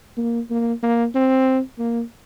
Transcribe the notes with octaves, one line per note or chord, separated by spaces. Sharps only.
A#3
A#3
A#3
C4
A#3